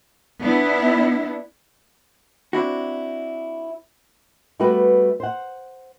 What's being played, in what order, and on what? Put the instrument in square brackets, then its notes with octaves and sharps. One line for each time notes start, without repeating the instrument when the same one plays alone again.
[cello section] B3 D4 E4
[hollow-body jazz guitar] C4 D4 E4 F#4
[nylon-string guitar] G3 A3 B3 F#4 B4
C5 F#5